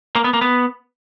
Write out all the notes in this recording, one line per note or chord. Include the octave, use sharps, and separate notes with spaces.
A#3
B3
A#3
B3